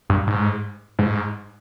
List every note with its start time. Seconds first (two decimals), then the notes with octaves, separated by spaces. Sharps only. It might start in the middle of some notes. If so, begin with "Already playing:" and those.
0.10 G2
0.27 G#2
0.99 G#2